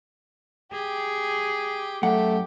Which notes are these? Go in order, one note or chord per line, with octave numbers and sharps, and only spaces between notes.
G4 G#4
F#2 A3 G4 F#5